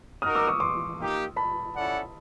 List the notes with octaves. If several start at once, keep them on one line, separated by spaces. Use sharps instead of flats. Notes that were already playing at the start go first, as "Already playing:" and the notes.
D#4 F#4 A#4 D#6 F6
D6 E6
C#6 D#6
C6 D6
A#3 D#4 G4
A5 B5
C#4 E4 A4 D5 F#5